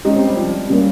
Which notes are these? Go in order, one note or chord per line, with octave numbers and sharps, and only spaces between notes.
G#3 C#4 D#4 G4
C4
G3
F3
G3 A#3 C#4 G4